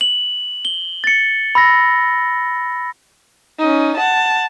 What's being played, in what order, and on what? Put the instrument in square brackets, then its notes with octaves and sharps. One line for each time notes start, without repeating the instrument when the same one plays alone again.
[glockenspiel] F#7
G7
A6 C#7
B5 E6 A#6
[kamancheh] C#4 D#4
F#5 A5